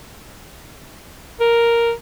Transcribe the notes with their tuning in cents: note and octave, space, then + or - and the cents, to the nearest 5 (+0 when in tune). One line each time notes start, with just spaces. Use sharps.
A#4 +0